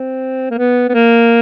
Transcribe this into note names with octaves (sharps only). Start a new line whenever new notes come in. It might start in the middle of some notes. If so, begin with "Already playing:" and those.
Already playing: C4
A#3
B3
B3
A#3